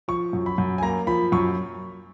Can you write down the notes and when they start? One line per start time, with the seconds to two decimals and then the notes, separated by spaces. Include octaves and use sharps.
0.08 F3 C#6
0.33 F#2
0.46 B5
0.58 F#2
0.78 G#5
0.82 A#3 A#5
1.07 F3 B5
1.32 F#2 C#6